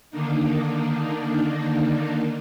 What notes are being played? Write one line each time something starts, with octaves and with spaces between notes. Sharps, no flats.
D3 D#3 A#3 D4 D#4